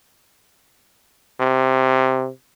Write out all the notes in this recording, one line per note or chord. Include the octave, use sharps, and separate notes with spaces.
C3